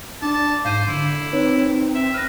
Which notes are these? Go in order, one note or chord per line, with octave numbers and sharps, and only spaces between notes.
D4 A5 D6
G#2 C5 F5 G6 D#7
D3 E4
C4 D#4 B4 C#5
E5 E6
B4 F6 A#6